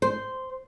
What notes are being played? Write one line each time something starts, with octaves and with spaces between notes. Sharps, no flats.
C5